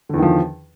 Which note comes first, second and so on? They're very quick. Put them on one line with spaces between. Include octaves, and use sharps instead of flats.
D3 E2 D#3 F3